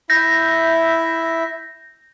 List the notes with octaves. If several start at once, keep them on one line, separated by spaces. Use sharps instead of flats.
E4 E5 G6 A#6